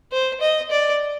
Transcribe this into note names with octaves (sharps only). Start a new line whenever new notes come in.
C5
D#5
D5